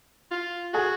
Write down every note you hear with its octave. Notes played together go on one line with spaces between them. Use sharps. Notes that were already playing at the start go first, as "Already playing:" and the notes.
F4
F#4 G#4